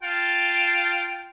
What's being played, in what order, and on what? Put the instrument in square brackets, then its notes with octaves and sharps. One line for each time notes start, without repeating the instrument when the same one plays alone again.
[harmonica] F4 G5 A5